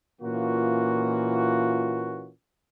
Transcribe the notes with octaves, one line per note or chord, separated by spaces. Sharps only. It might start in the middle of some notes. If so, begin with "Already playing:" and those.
A#2 E3 A#3 C#4 F4 F#4